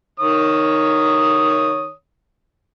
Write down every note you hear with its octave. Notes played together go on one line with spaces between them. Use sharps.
D#3 C#5 D#6